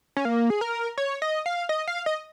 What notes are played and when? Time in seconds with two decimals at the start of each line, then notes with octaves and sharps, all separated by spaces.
0.17 C#4
0.25 A#3
0.50 G#4
0.61 A#4
0.98 C#5
1.22 D#5
1.46 F5
1.69 D#5
1.88 F5
2.06 D#5